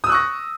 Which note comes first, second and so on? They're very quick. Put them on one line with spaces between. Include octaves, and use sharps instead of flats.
D#6 E6 F#6 C#6 A#6